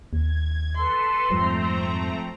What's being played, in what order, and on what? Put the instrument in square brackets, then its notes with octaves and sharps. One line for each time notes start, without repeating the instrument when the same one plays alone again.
[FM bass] D#2 [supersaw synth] G#6
[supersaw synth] A4 B4 [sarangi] C6
[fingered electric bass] F2 G#2 G3 [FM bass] F3 [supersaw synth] A3 C4 A#5